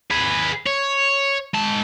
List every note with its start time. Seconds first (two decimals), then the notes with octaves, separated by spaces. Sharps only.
0.11 G#4 B4
0.66 C#5
1.55 G#3 A5